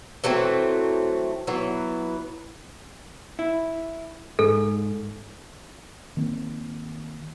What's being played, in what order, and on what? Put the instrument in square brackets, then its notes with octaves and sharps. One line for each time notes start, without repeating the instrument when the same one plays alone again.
[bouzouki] E3 F#3 A3 C4
E3 F#3 B3
[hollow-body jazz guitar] E4
[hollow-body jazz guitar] G#2 [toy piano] A4
[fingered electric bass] D#3 A#3 C4